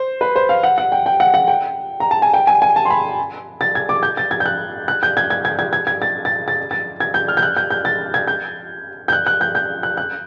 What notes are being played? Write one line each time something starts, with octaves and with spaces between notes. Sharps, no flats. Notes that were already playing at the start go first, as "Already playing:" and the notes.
Already playing: C5
B4
C5
F5
F#5
F#5
G5
G5
F#5
F#5
G5
A#5
A5
G#5
G5
G#5
G#5
A5
C6
B5
A6
G#6
D6
G6
A6
G#6
G6
F#6
F#6
G6
G#6
G#6
G#6
G#6
G#6
G#6
A6
A6
A6
A6
G#6
G6
F6
G6
F#6
G6
G6
A6
G#6
G6
G6
F#6
F#6
G6
G6
F#6
F#6